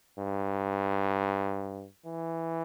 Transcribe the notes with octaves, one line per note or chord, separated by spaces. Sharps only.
G2
E3